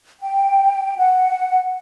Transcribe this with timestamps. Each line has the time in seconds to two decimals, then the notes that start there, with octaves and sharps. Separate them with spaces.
0.20 G5
0.98 F#5